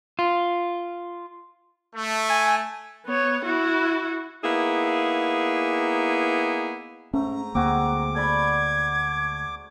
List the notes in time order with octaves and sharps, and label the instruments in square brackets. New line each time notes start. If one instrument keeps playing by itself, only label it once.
[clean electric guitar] F4
[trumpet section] A3
[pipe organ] G#5
[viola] B3 C#5
E4 F#4
[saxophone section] A#3 B3 D#4 E4 G#4
[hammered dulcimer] G#2 A3 [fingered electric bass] C#4 [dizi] A#5
[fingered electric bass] D2 A#3 [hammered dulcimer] C4 F#4 G#4 [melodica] D6
[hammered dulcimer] A4 D5 B5 [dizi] G#6